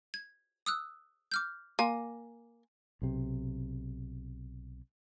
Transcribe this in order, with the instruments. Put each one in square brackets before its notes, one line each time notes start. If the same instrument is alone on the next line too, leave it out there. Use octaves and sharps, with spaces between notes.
[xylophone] G#6
D#6 E6 F#6
D6 F6 G6
[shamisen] A#3 [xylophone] G#5
[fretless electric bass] B1 C3